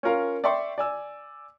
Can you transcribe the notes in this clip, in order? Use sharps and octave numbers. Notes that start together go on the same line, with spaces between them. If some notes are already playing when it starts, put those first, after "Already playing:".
C#4 F4 A#4 F5
D5 E5 G5 C6 C#6
D5 G#5 E6